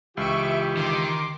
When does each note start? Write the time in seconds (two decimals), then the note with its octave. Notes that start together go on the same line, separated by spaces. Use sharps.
0.17 C#2 E3 F4 G4 E5 C#6 D7
0.77 D#3 C6 D6